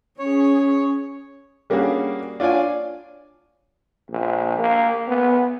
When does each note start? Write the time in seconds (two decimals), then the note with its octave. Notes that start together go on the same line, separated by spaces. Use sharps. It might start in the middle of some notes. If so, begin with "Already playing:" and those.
0.19 C#4 G#4 C#5
1.70 G3 A#3 C#4 D4 F#4 G#4
2.40 D4 F4 C#5 D5 G#5
4.11 A#1
4.59 A#3
5.07 B3